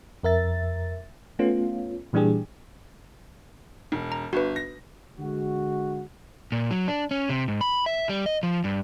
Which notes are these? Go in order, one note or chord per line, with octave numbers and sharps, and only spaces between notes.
F2 A#4 E5 A6
A3 B3 C#4 F4
A#2 E3 G3 D4 G4 G#4
E1
A#5
G1 F#4 B4
A#6
D3 G#3 F#4
A#2
F#3
D4
C#4
C3
G#2
B5
E5
G3
D#5
F3
G2